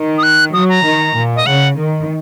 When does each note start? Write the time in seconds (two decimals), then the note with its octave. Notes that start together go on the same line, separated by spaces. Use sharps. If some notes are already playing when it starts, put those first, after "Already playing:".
Already playing: D#3
0.18 D#6
0.23 F#6
0.53 F#3 D#6
0.69 A#5
0.84 D#3
1.15 A#2
1.36 D#5
1.46 C#3 F#5
1.77 D#3